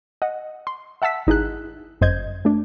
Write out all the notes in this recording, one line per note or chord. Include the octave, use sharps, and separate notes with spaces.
D#5 F#5
C6
E5 F#5 A5 E6 B6
G#1 D#4 E4 G#4 F#6
G1 F#2 C5 D#5 G6 G#6
A3 D4